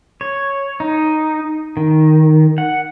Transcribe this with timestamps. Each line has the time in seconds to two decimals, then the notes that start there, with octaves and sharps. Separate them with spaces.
0.21 C#5
0.80 D#4
1.77 D#3
2.58 F#5